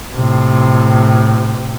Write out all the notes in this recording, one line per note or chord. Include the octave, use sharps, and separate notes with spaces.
A2 C3